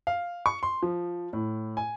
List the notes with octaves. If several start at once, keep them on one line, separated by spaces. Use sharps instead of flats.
F5
C#6
C6
F3
A2
G#5